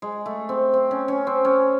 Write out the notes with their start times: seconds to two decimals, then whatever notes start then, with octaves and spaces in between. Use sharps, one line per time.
0.02 G#3
0.26 A3
0.49 C4
0.73 C4
0.91 C#4
1.08 C#4
1.27 C4
1.45 C#4